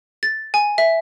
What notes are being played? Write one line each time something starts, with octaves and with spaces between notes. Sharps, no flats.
A6
G#5
E5